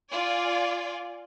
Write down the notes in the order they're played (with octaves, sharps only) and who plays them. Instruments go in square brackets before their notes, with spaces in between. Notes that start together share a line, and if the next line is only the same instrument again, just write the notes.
[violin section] F4 D5 G#5